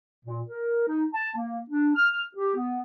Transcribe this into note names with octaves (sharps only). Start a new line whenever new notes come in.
A#2
A#4
D#4
A5
A#3
D4
F6
G4
B3